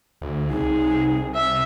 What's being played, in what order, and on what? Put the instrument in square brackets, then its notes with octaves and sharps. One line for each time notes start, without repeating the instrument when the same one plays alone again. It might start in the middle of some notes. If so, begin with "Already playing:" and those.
[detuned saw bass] D2
[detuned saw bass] C2 [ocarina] D#4 [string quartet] G#4
[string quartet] E5